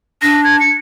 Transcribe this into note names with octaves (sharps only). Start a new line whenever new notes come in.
D4 A#6
G#6
C#7